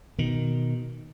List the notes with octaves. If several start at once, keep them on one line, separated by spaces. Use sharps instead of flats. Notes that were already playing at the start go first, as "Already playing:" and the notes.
B2 D#3